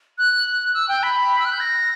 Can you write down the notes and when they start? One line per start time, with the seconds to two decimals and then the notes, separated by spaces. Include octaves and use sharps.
0.18 F#6
0.74 E6
0.89 G5
1.03 B5
1.39 E6
1.45 F#6
1.52 G6
1.60 A#6